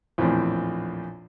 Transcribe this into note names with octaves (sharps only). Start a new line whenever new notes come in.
A#1 E2 A2 C4